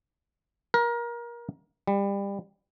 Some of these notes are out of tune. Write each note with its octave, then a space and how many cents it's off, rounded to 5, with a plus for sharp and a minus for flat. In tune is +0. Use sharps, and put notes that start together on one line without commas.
A#4 +25
G3 +25